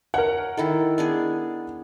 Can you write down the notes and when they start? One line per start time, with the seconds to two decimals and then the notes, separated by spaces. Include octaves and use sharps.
0.14 A#4 C#5 F#5
0.57 D#3 E4 A4
0.98 B3 D4 G#4